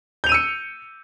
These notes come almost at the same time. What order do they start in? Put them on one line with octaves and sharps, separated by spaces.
G6 F7 D#7 E6 C#7